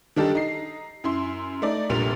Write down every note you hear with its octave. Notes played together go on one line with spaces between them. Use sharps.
D#3 G3 D4 D#4 G4 A4
D#4 C7
F#2 E4 C6
A3 D#4 D5
F1 A#1 A#2 G3 F7